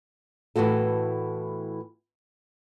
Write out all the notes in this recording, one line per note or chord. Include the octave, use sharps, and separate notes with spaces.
A2 E3 B3 F#4 A4